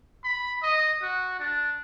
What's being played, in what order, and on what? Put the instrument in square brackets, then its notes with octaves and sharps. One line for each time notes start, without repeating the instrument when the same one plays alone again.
[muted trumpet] B5
D#5
F#4
D4